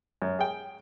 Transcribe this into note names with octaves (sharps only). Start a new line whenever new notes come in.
F#2
G#4 G5